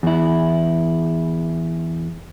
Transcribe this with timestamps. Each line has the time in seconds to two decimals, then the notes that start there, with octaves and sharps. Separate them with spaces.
0.03 E2 E4